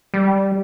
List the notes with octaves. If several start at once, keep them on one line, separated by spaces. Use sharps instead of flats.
G3